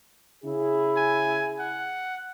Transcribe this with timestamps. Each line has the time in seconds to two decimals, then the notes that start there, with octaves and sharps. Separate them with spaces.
0.44 C#3 E4 G#4
0.97 G#5
1.59 F#5